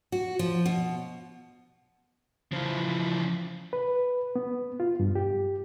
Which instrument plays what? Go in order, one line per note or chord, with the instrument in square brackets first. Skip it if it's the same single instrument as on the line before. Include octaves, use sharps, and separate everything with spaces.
[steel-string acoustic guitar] F#4
F3
B2
[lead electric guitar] C#3 E3 [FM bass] F3
[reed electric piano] B4
B3
F4
G2
G4